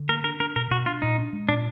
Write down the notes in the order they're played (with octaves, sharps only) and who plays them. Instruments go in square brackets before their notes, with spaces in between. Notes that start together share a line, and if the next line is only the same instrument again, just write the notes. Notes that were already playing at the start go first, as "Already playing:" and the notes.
Already playing: [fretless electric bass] D3
[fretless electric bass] A#3 [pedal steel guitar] A#4
[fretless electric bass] D4 [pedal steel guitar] A#4
[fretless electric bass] D4 [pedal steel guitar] A#4
[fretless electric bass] B2 [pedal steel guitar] A#4
[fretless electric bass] B2 [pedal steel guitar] F#4
[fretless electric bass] D4 [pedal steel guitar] F4
[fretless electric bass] A#2 [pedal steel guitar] D#4
[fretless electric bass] D4
G#3
[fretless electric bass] A#2 [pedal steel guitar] D4